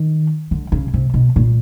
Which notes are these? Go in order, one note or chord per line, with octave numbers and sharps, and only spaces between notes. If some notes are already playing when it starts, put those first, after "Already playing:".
Already playing: D#3
D3
C#3
C3
B2
A#2